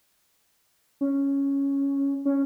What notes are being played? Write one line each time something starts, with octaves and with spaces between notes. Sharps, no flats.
C#4
C#4